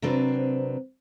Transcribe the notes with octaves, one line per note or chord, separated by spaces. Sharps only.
C3 F#3 C4 D4 A#4 B4